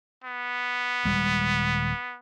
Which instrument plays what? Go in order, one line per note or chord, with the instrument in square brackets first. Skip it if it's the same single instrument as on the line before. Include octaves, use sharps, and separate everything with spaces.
[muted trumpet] B3
[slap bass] D#1 G3 G#3